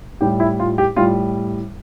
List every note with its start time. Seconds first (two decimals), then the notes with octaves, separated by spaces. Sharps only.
0.21 A2 G3 G4
0.40 E4
0.60 F4
0.78 G4
0.96 A2 G3 F4